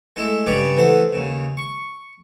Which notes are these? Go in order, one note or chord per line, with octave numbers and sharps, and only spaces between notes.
G#3 A3 E4
G2 C#3 G3 C#5 D5 D6
E3 A3 B3 C5
D#2 C#3
C#6